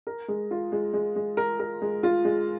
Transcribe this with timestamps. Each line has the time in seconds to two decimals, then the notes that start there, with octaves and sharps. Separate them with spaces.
0.07 A#4
0.28 G#3
0.51 F4
0.72 G#3
0.93 G#3
1.16 G#3
1.37 A#4
1.60 A#4
1.82 G#3
2.03 F4
2.25 G#3